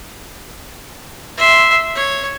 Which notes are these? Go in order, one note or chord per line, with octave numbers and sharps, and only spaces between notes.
E5 C6
C#5